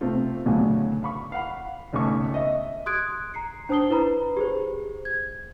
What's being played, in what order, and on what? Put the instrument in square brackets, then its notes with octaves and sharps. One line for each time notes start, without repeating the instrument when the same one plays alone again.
[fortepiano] C3 A3 C4 F4
D2 A2 C#3 F#3 G#5
F5 B5 C#6
F5 F#5 B5
G#1 C#2 A3 C#4 C#6
D#5 E5
[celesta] C6 D#6 F#6 G#6 D7
A#5 C7 C#7
D4 C5 A5 D#6 C7 G7
E4 B4 C5 A#5 B5
G4 G#4 C5
G#6